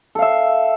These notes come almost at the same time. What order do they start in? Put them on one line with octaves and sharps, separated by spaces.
A4 F5 E5